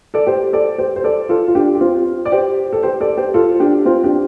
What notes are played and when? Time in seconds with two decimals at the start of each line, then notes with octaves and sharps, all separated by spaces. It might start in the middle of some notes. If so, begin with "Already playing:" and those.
0.14 A4 D5
0.27 G4 C5
0.53 A4 D5
0.78 G4 C5
0.96 C5
1.04 A4 D5
1.29 F4 A4
1.48 F4
1.55 D4 G4
1.75 G4
1.80 C4 F4
2.26 D5
2.32 G4 C5
2.73 A4
2.83 G4 C5
3.00 A4 D5
3.17 G4 C5
3.34 F4 A4
3.60 D4 G4
3.85 C4 F4
4.04 D4 G4